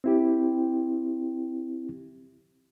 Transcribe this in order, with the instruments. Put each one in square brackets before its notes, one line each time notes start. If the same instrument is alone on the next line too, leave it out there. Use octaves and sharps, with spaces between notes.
[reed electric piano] C4 E4 G4